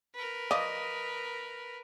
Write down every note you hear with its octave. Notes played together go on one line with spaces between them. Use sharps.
A#4 B4
F3 D5 D#5 F5